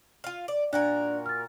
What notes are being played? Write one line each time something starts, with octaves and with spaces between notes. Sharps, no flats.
F4 F5
D5
A#2 D4 F#4 A#4 D5 F#6
F6 A6